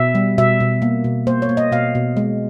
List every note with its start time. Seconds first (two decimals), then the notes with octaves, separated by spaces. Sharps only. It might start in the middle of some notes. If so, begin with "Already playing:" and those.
Already playing: B2 E5
0.15 G3
0.38 B2 E5
0.60 B2
0.82 A#3
1.04 B2
1.27 A#3 C5
1.42 C#5
1.49 A#3
1.57 D#5
1.72 B2 F5
1.95 B2
2.17 G#3